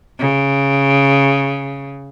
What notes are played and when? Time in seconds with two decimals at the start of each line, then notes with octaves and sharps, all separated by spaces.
0.19 C#3